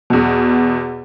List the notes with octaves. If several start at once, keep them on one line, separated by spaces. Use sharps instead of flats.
E2 B2